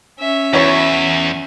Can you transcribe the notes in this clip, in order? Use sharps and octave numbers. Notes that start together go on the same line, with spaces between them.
C#4 E5
E2 F#3 E4 C#5